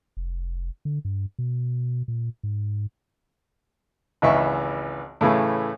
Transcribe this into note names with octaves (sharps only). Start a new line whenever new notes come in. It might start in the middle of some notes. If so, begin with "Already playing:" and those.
F1
D3
G2
B2
A#2
G#2
G#1 C#2 E3 E5 C#6
A2 C#3 E3 A3